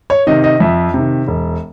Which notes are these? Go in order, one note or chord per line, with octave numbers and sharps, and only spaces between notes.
C#5
C3 D#3 D#5
D#5
F2 E5
C3 D#3
E1